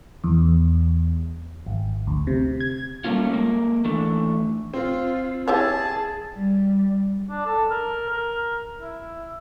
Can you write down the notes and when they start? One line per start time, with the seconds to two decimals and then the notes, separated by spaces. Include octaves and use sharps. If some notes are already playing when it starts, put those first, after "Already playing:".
0.24 E2
1.67 G#1
2.07 D2
2.27 C3
2.60 G#6
3.04 G3 A3 A#3 C#4 F4
3.30 G#3 A#3
3.85 E3 A3 D4
4.74 C4 F4
5.48 E4 G4 G#4 C#5 A5
6.35 G3
7.30 D4
7.45 A4
7.70 A#4
8.08 A#4
8.79 E4